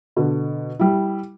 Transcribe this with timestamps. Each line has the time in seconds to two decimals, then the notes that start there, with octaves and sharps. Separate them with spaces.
0.17 B2 D3
0.79 G3 E4